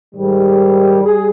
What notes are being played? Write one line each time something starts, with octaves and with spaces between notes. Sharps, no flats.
G#2 D#3 G3
G3 G#4